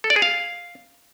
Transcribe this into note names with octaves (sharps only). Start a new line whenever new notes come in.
A4
D5
G#4
F5